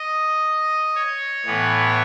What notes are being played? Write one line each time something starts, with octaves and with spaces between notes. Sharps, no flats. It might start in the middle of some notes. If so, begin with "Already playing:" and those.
Already playing: D#5
C#5
A2 E3 B3